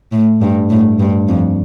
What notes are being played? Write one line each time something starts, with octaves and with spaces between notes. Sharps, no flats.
A2
G2
A2
G2
F2